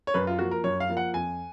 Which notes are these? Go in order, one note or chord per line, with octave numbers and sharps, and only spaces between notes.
C#5
F#2 B4
F4
F3 A#3 F#4
A#4
F#2 C#5
F5
F3 A#3
F#5
F2 G#5